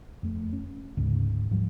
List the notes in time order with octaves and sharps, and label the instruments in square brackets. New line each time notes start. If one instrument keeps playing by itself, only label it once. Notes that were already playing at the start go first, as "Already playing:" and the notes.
[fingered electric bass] F2 A3
C#4
D1 D2 G#2 C#3
G#2 F3 G3